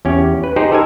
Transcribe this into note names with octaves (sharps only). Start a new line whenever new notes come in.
E2 C#4 G4
B4
D#4 G4 G#4 C5
A4 A#4 G#5